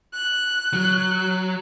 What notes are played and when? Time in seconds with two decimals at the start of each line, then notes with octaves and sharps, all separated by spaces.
0.14 F#6
0.74 F#3